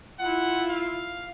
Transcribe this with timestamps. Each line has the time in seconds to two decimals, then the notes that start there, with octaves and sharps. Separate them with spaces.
0.20 E4 F4 F#5
0.70 F5